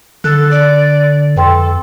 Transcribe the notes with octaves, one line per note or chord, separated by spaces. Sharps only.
D3 A4 F#6
D5
F2 A4 B4 G5 C6